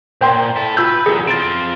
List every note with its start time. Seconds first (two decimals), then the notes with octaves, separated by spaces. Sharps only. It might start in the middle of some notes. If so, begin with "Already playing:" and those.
0.21 A#2 C5 G5 C6
0.56 E4 A4
0.77 F4 B4 B5 E6 G6
1.06 E2 F#3 G#4
1.27 C4 F4 A6 D7